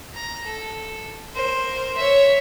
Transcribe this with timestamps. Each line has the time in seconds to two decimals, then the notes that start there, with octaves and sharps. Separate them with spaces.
0.14 A#5
0.46 A4
1.33 A#4 C5
1.97 C#5 E5